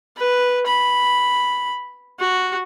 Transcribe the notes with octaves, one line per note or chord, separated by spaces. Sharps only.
B4
B5
F#4